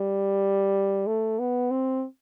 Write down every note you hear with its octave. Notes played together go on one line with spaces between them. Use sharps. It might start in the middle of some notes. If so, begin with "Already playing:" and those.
Already playing: G3
A3
B3
C4